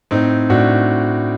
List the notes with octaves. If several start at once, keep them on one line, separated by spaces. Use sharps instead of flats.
A2 C4 D#4
A2 D4 F#4